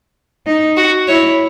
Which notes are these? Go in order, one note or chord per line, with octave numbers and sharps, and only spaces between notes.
D#4
F#4
E4 C#5